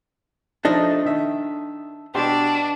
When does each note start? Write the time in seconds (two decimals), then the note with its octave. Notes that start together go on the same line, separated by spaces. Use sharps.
0.65 F3 A3 D4 D#4 A4 D#5
1.06 D#3 E5
2.15 B2 D4 G4 C6